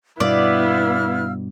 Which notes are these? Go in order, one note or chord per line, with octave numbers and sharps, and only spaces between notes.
G2 B2 B3 E4 D5 F5 E6 F6